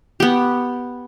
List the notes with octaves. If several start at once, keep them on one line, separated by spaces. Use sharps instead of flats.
B3 G4